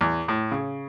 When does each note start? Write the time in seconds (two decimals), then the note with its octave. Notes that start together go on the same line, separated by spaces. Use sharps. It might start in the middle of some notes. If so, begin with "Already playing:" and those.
0.01 E2
0.28 A2
0.52 C#3